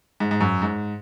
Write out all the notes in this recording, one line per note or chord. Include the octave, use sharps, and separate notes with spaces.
G#2
G#2
F#2
G#2